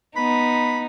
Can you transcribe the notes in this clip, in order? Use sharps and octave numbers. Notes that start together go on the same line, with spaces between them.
B3 D#4 B5